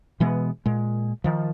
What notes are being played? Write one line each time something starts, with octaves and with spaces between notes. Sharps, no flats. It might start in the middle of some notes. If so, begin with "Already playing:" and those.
B2 E3 G#3 B3
A#2 G#3
D#3 F3